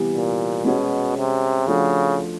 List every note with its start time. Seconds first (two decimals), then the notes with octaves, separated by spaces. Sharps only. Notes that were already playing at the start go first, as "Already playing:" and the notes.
Already playing: C3 E3 G3 B3
0.14 A#2
0.64 B2 G#3 C#4 F#4
1.17 C3
1.67 C#3 F3 A3 D4 F#4